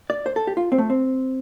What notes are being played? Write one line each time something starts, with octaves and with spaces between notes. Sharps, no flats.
D5
C5
A4
G4
F4
C4
A3
C4